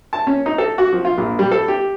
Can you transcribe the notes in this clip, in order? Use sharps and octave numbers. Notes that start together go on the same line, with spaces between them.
A5
C#4
D#4
A4
F#4
F3
F4
A#1
G3
A4
G4